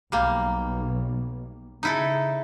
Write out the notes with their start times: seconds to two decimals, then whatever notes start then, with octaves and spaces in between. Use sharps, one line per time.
0.12 B1 G3 A#3
1.83 C#3 D#4 E4 A4